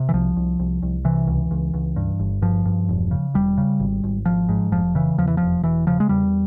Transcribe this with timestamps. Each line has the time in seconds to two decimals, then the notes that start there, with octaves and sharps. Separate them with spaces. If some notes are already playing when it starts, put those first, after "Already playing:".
Already playing: C3
0.09 E3
0.13 C2 F3
0.37 C2
0.60 C2
0.82 C2
1.05 C3 E3
1.27 C#2
1.51 C#2
1.74 C#2
1.96 G2
2.20 G1
2.42 G2 F3
2.65 G2
2.89 E1
3.11 C#3
3.34 E1 G3
3.58 C#3
3.80 G#1
4.04 G#1
4.26 G#1 F3
4.49 G#2
4.72 F1 F3
4.95 C#3 E3
5.18 E2 F3
5.27 E3
5.37 F1 F3
5.63 E1 E3
5.87 C#3 F3
6.00 G#3
6.09 E2 G3